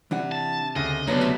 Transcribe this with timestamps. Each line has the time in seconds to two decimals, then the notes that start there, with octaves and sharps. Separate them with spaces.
0.11 C3 E3 D4 F#5
0.32 A5
0.76 D2 C#3 D#5
1.07 D2 C3 F#3 B3 D4 F#5
1.21 A3 F#4 E5